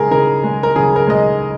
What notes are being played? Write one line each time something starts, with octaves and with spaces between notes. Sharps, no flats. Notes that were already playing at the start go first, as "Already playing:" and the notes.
Already playing: C#3 G#3 G#4 A#4 A#5
C#3 A#4
G#3
A#4
C#3 G#4
A#4
G#3 D#5